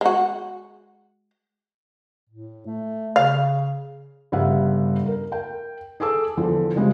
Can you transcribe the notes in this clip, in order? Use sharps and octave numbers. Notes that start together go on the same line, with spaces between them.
G#3 F#4
A2
A3
C#3 F5
G1 C#3 G3 E5 F#5
A#4
A#4 G5
G#4 A4 G#5 D6 E6
E2 D3 F3
C#3 G3 G#3 C4